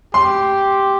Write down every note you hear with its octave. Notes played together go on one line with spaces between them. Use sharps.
G4 C6